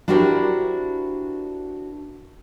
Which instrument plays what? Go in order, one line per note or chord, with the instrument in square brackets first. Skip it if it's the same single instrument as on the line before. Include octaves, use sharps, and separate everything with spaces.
[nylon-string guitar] D4 E4 F#4 G4 A#4 C5